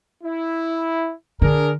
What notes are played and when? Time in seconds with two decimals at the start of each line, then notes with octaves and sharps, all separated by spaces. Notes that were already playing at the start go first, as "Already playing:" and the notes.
0.24 E4
1.42 D3 D4 G#4 A#4